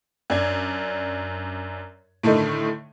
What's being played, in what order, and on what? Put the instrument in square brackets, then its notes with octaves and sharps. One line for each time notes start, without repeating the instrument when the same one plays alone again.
[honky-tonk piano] F#2 D4 G#6
A2 D3 D#3 A3 D#4